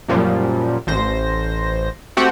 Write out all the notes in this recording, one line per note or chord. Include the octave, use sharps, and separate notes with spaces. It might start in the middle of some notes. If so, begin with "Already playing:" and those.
F#2 A#2 F3 G3
A1 C5 A#6
A3 C4 F#4 G4 F#5 G5